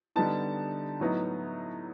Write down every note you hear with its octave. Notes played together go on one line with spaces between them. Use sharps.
D3 G3 B3 D#4 A5
A2 F#3 B3 D#4